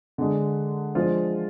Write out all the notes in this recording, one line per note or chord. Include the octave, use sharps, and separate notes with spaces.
D3 G#3 D4 G#4
F3 G#3 D4 F4 C5